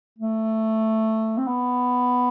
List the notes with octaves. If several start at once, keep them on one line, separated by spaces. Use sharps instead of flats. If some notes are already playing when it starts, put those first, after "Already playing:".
A3
C4
B3